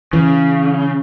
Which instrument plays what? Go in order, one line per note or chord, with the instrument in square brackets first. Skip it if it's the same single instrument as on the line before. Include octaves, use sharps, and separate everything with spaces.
[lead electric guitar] C#3 [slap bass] E3